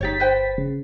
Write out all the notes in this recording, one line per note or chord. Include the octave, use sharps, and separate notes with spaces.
G1 D#4 G4 C#5 A6 B6
B4 C5 G5
C#3